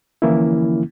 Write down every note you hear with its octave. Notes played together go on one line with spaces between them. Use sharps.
D3 E3 F3 A#3 C#4 E4